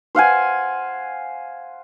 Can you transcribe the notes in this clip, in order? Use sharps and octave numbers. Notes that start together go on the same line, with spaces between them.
C5 F5 F#5 G#5